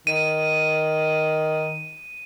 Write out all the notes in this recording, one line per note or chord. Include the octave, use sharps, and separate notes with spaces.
D#3 D#7